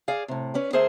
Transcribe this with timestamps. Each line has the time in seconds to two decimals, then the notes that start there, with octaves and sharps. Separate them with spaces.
0.08 G#4 D5 F5
0.28 A2 C3
0.54 C#4 B4 D5
0.73 D2 G#4 A#4 C5 E5